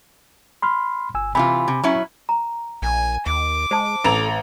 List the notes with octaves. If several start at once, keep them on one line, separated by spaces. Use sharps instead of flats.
B5 C6 F6
G1 G#5 E6
C3 E3 F4 G#5 B5
C3
F#3 C#4 E4
A#5
A#1 G#5
D#2 D6
G#3 C5 A5
A1 A4 A#5 F7